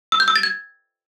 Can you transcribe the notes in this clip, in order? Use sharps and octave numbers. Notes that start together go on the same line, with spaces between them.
E6
G6
E6
A6
G#6